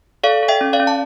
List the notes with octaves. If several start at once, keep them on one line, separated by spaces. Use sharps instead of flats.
A4 D5 F5
A4
E5 G5
C#4
D5 F5
C#4
A5